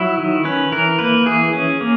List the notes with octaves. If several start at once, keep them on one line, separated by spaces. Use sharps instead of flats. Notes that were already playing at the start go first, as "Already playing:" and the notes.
Already playing: F#3 E4
D#3
C#4 B4
E3 A#4
A#3 B4
E3 G#4
C#4
A#3